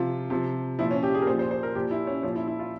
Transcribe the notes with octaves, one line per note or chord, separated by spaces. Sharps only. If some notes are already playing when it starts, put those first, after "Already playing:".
Already playing: C3 F3 F4
C3 F3
A#2 F3 E4
C#4
G4
G#4
A#4
A#2 F3 C5
C5
C5
A#4
A#2 F3 G4
E4
C#4
A#2 F3 C#4
E4
E4
F4